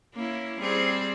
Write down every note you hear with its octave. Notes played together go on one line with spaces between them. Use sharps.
A#3 C#4 E4
G3 C4 G#4